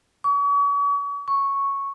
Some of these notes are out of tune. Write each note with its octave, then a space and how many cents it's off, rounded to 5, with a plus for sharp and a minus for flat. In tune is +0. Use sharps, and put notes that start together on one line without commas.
C#6 +40
C#6 -5